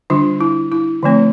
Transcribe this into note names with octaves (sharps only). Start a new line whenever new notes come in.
D3 G3 D4 F4
E4
E4
D3 F3 A3 C4